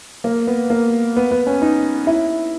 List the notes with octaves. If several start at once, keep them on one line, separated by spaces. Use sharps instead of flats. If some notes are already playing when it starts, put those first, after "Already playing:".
A#3
B3
A#3
B3
B3
C#4
D#4
E4